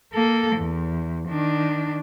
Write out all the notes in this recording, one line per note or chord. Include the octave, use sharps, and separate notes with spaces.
A#3 A4
E2
D#3 D4